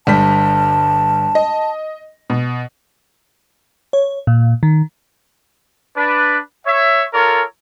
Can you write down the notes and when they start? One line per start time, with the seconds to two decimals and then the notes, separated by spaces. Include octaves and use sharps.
0.07 G1 G3 A5 B6
1.35 D#5
2.30 B2
3.93 C#5
4.27 A#2
4.63 D#3
5.96 D4 B4
6.66 C#5 E5
7.13 F4 A4 A#4 C#5